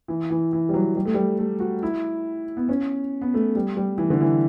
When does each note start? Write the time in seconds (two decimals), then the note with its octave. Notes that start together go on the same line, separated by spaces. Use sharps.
0.08 E3
0.30 E3
0.53 E3
0.69 G3
0.74 F#3
0.96 G3
1.06 A3
1.14 G3
1.39 A3
1.60 F#4
1.83 E4
2.57 B3
2.69 C#4
3.21 B3
3.34 A3
3.56 G3
3.77 G3
3.98 E3
4.10 D3
4.21 E3